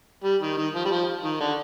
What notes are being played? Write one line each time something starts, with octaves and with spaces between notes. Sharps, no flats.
G3
D#3
D#3
F3
G3
F3
D#3
D3